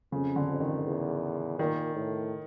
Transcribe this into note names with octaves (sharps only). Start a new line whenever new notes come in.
F2 C#3
D3
F2
D#3
E2
A#2 D#3
A2